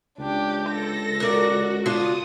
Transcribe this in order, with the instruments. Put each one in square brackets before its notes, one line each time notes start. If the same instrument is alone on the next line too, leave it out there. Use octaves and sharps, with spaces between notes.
[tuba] C#2 [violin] D4 G4
[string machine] A4 [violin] A#6
[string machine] F#4 [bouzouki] A#4 D5
[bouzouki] D4 F4 [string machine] D#6